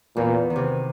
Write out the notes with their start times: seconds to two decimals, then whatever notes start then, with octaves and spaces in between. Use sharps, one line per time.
0.16 E2 A#2
0.50 D#3
0.56 C3